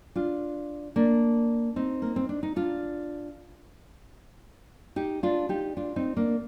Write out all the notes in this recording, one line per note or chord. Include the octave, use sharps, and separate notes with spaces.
D4 F4
A#3 D4
C4 D#4
A#3
C4
D4
D#4
D4 F4
D#4 G4
D4 F4
D#4 G4
D4 F4
C4 D#4
A#3 D4